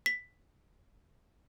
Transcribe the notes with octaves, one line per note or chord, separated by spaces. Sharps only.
B6